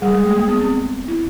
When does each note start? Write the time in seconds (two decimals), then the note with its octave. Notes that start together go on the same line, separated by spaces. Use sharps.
0.01 G3 G#4
0.14 G#3
0.25 A3
0.37 A#3
0.48 B3
0.61 C4
1.08 E4